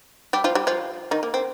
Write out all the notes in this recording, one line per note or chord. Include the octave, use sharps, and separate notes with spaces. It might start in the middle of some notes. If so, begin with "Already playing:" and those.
G3 G4
F3 F4
G3 G4
F3 F4
D#3 D#4
A#3
C4